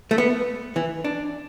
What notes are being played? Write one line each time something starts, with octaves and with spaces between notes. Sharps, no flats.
A3
B3
E3
D4